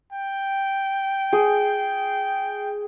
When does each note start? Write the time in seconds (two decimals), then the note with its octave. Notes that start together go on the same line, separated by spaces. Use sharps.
0.13 G5
1.33 G#4